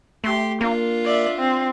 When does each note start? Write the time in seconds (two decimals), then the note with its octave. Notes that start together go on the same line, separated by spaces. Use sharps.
0.24 A3 G4 C6
0.61 A#3 D4 F4
1.04 D5 E5
1.39 C4